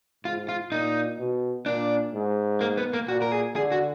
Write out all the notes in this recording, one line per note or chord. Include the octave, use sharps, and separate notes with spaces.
G#2 F4
F4
A#2 D#4
B2
A#2 D4
G#2
A#3
B3
A#3
A#2 F#4
A#4
G#4
D3 G#4
F#4